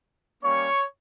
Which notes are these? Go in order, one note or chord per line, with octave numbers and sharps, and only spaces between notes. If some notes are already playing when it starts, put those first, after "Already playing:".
G3 A#3 C#4 C#5 C#6